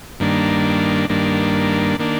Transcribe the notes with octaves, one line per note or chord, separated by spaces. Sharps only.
G2 D#3 A#3 D4
G2 D#3 A#3 D4
D#3 A#3 D4